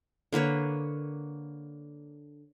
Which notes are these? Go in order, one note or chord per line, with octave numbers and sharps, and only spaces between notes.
D3 A#3 B4 C#5